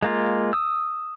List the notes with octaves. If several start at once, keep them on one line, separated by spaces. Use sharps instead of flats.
G#3 A#3 F4
D#6 E6